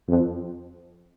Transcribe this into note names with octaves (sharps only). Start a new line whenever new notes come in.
F2